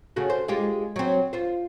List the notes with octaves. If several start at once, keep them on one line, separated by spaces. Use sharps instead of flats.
C#3 A3 F#4
C5
G#3 F4 G4
F#3 C4
F4 C5